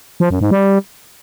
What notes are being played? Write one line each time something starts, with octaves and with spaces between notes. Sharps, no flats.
F3
F#2
G#2
G3